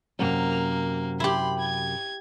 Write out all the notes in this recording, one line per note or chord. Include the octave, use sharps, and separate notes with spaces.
F#2 C3 A#3
E4 G4 B5 C6
G#6